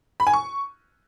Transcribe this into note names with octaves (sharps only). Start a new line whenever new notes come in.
B5
G#5
C#6